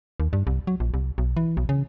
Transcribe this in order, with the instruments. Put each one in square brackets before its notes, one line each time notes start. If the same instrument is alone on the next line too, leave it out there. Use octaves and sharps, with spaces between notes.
[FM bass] D#2
G2
C2
F#3
A#1
C2
B1
E3
B1
C#3